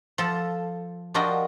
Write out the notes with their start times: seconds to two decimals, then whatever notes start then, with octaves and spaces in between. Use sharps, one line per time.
0.18 F3 A4
1.14 F3 D4 F#4 G4 A#4 D#5